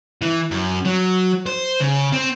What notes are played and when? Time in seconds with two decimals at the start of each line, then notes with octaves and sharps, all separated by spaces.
0.22 E3
0.51 F#2
0.85 F#3
1.46 C5
1.80 C#3
2.12 C4